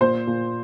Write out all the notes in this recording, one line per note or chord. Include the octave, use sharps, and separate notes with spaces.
A#2 C5
A#2